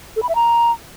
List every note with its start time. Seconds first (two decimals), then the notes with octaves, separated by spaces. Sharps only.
0.16 A4
0.23 B5
0.29 E5
0.35 A#5